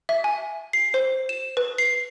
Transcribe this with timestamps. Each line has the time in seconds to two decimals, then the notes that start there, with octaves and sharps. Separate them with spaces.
0.09 E5
0.24 G#5
0.73 C7
0.94 C5
1.29 E7
1.57 B4
1.78 C7